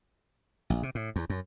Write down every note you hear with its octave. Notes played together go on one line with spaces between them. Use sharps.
A#1
C3
A2
E2
F#2